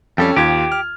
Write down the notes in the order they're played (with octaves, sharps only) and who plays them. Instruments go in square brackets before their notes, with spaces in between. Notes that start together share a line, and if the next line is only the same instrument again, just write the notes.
[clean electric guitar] F2 G3 [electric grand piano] C#4 A4 G5
[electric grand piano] D#2 F4 G#6 [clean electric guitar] G4
[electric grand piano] F6